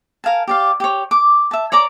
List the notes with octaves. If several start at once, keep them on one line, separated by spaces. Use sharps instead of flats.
A#4 F5 G#5 A5
G4 D5 F5
G4 C#5
D6
E5 A5
C#5 D5 A#5 D6